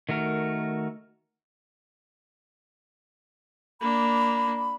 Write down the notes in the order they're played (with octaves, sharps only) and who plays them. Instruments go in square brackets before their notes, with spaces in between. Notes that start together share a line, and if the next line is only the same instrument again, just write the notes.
[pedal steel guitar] D#3 A3 F#4 A#4
[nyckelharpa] A#3 D4 [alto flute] B5